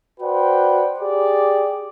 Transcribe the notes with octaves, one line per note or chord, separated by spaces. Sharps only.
F#4 B4 C5 D5 F#5 G5
G4 G#4 D5